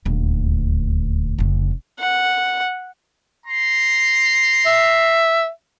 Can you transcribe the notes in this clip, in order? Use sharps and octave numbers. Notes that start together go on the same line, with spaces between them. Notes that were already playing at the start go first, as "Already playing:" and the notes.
D#1 D2
F1 C#3
F#5
A#5 C6
E5